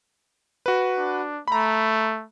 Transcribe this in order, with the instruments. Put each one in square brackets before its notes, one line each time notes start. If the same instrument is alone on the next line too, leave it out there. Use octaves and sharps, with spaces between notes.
[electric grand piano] F#4 B4
[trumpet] D4
[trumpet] A3 [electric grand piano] A#5 B5